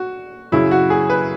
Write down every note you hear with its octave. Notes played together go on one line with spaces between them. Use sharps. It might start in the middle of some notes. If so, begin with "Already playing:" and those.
Already playing: F#4
F#2 C#3 F#3 E4
F#4
G#4
B4